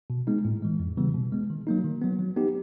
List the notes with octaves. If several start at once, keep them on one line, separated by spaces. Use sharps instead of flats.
B2
G#3 B3 D#4
A2
E3 G#3
F2
C#3 E3 G3 B3
B2
G#3 B3
D#3
F#3 A#3 D#4
D#3
F#3 B3
F#3
B3 D#4 G4